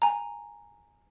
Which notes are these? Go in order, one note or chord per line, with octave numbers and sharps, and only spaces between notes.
G#5 A#5